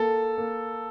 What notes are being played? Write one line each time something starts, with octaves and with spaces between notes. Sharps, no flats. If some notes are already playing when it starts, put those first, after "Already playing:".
Already playing: A#3 A4
A#3